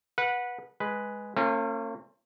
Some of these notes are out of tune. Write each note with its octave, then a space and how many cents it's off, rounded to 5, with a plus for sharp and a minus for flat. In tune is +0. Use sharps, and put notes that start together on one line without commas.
B4 -15 F#5 -20
G#3 +0 B4 +0
A#3 -45 C#4 -35 F4 +0